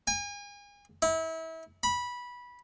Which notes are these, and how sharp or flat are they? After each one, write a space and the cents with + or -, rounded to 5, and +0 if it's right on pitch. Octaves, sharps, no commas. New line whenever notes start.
G#5 -35
E4 -30
B5 -15